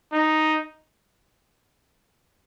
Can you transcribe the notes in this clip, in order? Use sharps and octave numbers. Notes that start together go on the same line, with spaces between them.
D#4